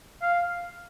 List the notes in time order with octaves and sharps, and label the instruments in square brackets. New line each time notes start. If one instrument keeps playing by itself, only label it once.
[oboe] F5